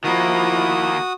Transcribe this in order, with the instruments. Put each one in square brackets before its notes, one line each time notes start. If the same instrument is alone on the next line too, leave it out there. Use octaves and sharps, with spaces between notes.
[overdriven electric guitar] D#3 A#3 [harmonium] F3 E4 [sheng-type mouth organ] F#4 D#6